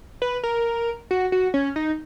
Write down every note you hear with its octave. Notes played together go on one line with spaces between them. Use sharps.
B4
A#4
F#4
F#4
C#4
D#4